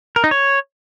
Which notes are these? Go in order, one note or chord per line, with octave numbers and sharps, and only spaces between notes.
A#4
D#4
C#5